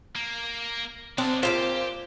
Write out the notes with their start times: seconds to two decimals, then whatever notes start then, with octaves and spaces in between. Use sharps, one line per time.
0.16 A#3
1.18 G#3 C4 D4 F5
1.43 A#2 C#3 F4 G4 C5